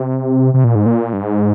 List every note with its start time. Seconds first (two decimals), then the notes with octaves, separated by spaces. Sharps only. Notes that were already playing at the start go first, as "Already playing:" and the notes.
Already playing: C3
0.54 C3
0.64 A#2
0.75 G#2
0.86 A#2
1.13 G2
1.22 G#2